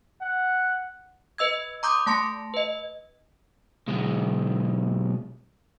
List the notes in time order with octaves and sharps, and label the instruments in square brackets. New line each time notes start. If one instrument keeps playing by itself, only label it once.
[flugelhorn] F#5
[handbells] B4 D#5 E6 G#6
A#5 C6 D6 D#6 G6
A3 A5 C6 A#6 C#7
B4 D#5
[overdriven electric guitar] B1 G#3